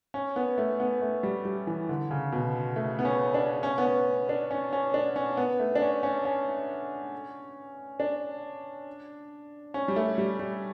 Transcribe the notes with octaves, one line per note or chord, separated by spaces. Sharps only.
C#4
B3
A3
B3
A3
G3
G3
E3
D3
C#3
B2
A3
B3
C#4
D4
C#4
B3
C#4
D4
C#4
C#4
D4
C#4
B3
A3
D4
C#4
C#4
C#4
D4
C#4
G3
A3
G3
G3